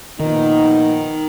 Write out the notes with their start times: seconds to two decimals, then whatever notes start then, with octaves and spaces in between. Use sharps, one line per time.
0.20 A#2 D#3 F3 B3 D#4